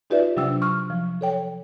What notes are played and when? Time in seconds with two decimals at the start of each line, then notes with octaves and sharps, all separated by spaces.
0.10 D#4 F4 G4 B4 D5 E5
0.36 C3 F#3 D4 G5 E6
0.62 C#6 F6
0.90 F3
1.21 A4 C#5 G5